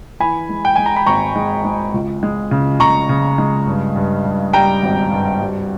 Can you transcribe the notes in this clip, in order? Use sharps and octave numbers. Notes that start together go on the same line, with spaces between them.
E3 G#5 B5
G#3
G5
G#3 G#5
A#5
B5
G#1 A#5 C#6
G#3
G#3
C#2
G#3
C#3
C#3 A#5 C#6
C#3
G#3
G2
G2
G2
G3 G5 A#5
G#1
G2
G3